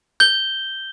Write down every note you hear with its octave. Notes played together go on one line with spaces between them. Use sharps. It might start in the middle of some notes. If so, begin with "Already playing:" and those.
G6 G7